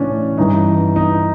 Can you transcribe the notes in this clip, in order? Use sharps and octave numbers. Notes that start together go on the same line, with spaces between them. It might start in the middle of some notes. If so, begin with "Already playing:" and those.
Already playing: A2 E3 C#4 D4
G2 E3 D#4
D#4